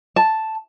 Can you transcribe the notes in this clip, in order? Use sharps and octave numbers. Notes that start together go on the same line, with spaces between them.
A5